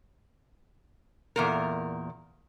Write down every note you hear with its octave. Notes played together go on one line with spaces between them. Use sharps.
E2 A#2 A#4